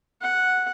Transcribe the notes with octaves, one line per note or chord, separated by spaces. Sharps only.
F#5